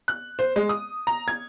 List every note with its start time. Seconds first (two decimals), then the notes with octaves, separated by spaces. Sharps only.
0.08 F#6
0.39 C5
0.56 G#3
0.69 D#6
1.07 A#5
1.28 G#6